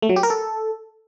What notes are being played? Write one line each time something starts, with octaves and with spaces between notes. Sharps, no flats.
A3
F#3
G4
A#4
A4